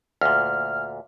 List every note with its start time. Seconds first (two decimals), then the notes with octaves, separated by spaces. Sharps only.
0.21 D2 A#2 F6